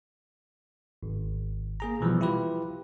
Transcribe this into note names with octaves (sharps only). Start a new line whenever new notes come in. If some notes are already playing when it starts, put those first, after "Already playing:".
G#1
A#3 G#4 A#5
B2 E3 F3 G3
E4 F4 G4 B4